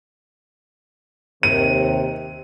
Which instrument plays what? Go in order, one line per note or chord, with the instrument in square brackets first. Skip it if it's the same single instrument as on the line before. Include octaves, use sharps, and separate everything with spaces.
[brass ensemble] D#2 C3 D#3 [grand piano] D#7